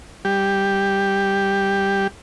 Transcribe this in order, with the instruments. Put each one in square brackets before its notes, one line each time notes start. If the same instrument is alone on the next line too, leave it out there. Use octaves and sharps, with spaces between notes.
[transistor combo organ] G3 G4